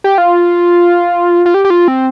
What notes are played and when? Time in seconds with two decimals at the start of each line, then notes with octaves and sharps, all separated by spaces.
0.04 G4
0.18 F4
1.46 F4
1.54 G4
1.65 G4
1.70 F4
1.88 C4